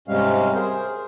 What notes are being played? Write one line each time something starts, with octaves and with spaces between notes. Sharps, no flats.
G#2 C3 G3 G#3 C#4 F5
G#4 A#4 C5